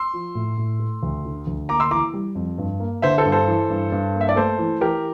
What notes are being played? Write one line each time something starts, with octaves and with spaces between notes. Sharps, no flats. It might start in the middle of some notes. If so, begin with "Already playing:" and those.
Already playing: C6 E6
F3
A2
A2
A3
D2
D3
D2
A#3 A#5 D6
C6 E6
E3 A#5 D6
G3
F2
G2
A#3
D3 C5 E5
A4 C5
G2
A4 C5
E3
G2
G2
A#3
E5
D5
A3 A4 C5
E3
E3 G4 A#4